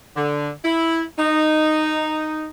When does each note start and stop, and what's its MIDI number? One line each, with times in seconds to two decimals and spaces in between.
0.17 0.50 50
0.64 1.02 64
1.19 2.48 63